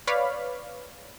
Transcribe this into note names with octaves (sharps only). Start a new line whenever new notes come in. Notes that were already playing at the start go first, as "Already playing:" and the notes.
B4 C#5 D5 F5 B5